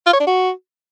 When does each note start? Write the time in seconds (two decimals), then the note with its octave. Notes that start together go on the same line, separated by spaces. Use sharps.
0.06 F4
0.13 C#5
0.20 D4
0.27 F#4